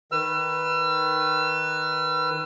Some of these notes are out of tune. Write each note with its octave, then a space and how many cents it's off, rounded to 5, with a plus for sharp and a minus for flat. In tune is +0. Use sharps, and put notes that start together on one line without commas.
D#3 +0 B4 +0 E6 +40